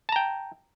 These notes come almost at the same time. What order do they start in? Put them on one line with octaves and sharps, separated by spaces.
A5 A#5 G5